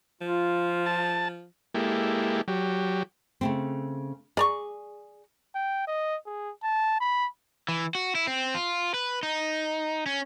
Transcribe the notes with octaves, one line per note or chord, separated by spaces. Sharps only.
F3 F4
A5
G#3 A#3 E4 G4 A4
F#3 G4
C#3 A3 C4
G#4 D5 A#5 C#6
G5
D#5
G#4
A5
B5
E3
F#4
E4
C4
F4
B4
D#4
C#4